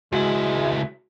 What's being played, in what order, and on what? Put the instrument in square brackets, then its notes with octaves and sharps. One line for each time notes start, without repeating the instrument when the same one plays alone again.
[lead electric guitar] C#2 E4 [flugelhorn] G#3 [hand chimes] F#4